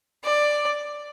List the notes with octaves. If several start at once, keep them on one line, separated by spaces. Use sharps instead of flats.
D5